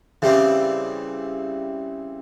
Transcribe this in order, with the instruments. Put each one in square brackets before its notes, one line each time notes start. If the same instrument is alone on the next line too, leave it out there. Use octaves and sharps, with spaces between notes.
[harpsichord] C#3 E3 G3 C4